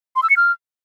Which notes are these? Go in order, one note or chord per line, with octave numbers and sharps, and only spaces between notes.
C6
E6
C#7
F6